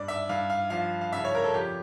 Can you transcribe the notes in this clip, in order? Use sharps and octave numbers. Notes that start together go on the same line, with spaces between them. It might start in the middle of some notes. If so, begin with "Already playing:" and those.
Already playing: G2 D5
E5
G2 F5
F5
F3 F5
F5
C#3 E5
C#5
A#4
A4
F2 G4